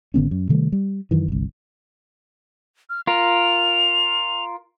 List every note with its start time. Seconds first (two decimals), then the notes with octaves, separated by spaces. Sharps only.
0.14 G#1 D3 B3 C#4
0.31 F#2
0.49 C3 D#3 G3 A3
0.72 G3
1.11 F#2 D#3 E3
1.28 G1 C2
2.90 F6
3.07 F4 A#4 F7